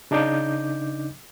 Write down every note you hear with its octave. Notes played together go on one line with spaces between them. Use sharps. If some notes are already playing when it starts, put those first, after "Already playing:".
C#3 D4 D#4 D6 G6